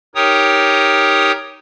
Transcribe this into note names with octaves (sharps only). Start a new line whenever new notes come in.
D#4 G4 A#4 C#5 G5 D#6